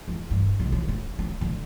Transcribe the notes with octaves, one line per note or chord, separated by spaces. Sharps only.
E2
G2
B1
C#3
C#4
C#4
D3